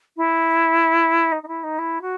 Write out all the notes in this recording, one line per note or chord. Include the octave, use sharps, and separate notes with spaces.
E4
D#4
D#4
E4
D#4
E4
F#4